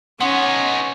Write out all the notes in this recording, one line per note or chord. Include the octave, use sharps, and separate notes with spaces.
B3 C#4 D#4 F#5 C6 D#6